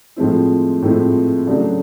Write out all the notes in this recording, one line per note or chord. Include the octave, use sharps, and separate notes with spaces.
A2 F3 G#3 C4 E4
A2 F3 G#3 C4 E4
C#3 F#3 A3 D4